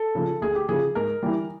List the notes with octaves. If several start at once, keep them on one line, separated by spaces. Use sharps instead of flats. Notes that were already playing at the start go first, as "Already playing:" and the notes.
Already playing: A4
C#3 F3
D2 G#4
G4
C#3 F3 G#4
G#2 A#4
E3 G3